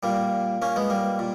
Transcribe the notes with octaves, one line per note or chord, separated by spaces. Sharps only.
A#2 G3 A#3
A#3 C#4
G#3 B3
G3 A#3
A#2